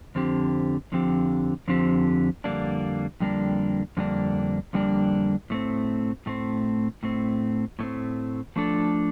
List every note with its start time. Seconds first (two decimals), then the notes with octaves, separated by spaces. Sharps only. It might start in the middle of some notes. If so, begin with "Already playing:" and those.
0.15 F2 D3 F3 C4 G4
0.92 F2 D3 F3 C4 G4
1.68 F2 D3 F3 C4 G4
2.44 F2 D3 G3 A#3 D4
3.20 F2 D3 G3 A#3 D4
3.97 F2 D3 G3 A#3 D4
4.73 F2 D3 G3 A#3 D4
5.50 A2 A3 C4
6.26 A2 A3 C4
7.03 A2 A3 C4
7.79 A2 A3 C4
8.56 F3 A3 D4 A4